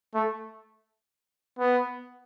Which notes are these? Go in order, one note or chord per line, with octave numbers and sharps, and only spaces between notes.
A3
B3